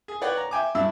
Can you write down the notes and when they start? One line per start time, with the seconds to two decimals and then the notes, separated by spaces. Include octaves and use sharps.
0.08 G#4
0.22 B4 C#5 D5 F#5 G5
0.37 A#5
0.51 E5 G5 G#5 D6
0.75 G2 D4 E4 E5 E6